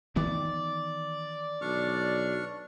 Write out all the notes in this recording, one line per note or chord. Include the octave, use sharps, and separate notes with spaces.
D#3 E3 B3 D5
B1 D4 C#6 F6